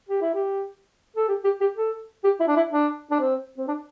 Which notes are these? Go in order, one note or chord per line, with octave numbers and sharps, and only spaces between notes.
G4
E4
G4
A4
G4
G4
G4
A4
G4
E4
D4
E4
D4
D4
C4
C4
D4